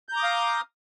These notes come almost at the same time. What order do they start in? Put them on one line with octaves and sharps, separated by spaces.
G6 A#5 D6 D#6 F5